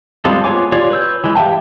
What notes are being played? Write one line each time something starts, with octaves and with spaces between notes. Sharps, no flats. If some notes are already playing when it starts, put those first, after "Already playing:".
G3 G#3 C4 F4 A4
B3 F4 C#5 G#5 D6
F4 G4 C#5 D5
B4 C#5 E6 G6
E3 G#3
G4 E5 F5 G5 A5